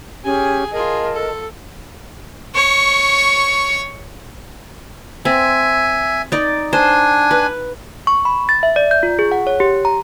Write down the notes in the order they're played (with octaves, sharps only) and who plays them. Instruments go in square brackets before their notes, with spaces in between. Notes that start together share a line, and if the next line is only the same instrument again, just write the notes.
[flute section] C#4 G4 [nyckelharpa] G#4 G#5
[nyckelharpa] F4 G#4 [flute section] A#4 D#5 A5
[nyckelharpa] A4
[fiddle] C#5 C#6
[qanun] C4 [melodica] E5 G#5
[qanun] D#4 D5
[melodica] D4 G#5 [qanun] C5
[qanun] B4
[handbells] C#6
B5
A6
E5
D5
G6
F4
G#4
F#5
C#5
G4
A#5